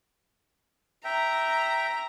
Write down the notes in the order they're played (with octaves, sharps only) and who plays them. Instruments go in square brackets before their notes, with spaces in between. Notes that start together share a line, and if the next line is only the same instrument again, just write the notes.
[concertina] E5 G5 [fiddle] A#5